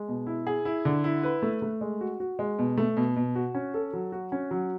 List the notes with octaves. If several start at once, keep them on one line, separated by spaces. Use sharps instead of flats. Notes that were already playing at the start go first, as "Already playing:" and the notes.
Already playing: G#3
B2
E4
G#4
E4
D3
E4
B4
A3
A3
G#3
F#4
F#4
G#3
B2
A3
B2
B2
F#4
C#4
A4
F#3
F#4
C#4
F#3